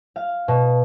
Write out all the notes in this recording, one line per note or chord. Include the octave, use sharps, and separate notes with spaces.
F5
B2